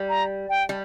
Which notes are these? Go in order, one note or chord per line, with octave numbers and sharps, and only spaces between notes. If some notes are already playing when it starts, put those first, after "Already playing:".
Already playing: G3
A#5
G5
G3